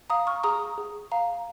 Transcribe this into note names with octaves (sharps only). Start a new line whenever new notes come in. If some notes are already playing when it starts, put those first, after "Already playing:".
F5 A#5 D#6
C#6 F6
G#4 A#5 D#6
G#4
F5 A#5